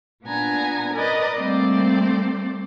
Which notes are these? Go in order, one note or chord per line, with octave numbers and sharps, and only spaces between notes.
A#2 B3 D4 G#5 A#5
A#4 B4 D5 D#5 D#6
G3 A3 A#3 C4 C5 D5